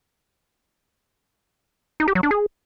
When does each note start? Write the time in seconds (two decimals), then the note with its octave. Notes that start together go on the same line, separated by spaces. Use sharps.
2.00 D#4
2.08 G4
2.15 F#3
2.23 D4
2.31 G#4